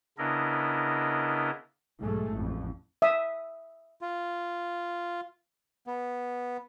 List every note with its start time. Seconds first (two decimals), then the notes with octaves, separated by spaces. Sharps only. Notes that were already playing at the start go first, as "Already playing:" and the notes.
0.18 C#3 B3 D4 E4 A#4 D#5
2.00 B1 G#2 G#3 A3
2.32 A1 F2
3.02 E5 D#6
4.01 F4
5.87 B3